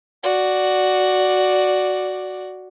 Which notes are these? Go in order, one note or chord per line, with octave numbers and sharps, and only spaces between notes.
F#4 D5